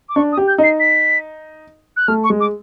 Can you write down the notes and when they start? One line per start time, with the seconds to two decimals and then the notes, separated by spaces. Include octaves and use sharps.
0.09 D6
0.16 D4 C#6
0.32 D#6
0.37 G4
0.48 G6
0.58 D#4
0.64 C7
0.80 B6
1.97 F#6
2.08 A3 F6
2.24 C#6
2.30 G#3
2.40 D6